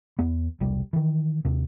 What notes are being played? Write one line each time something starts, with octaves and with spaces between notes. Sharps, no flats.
E2 B3
E1 C2 G3
D#3 E3
D#2 C3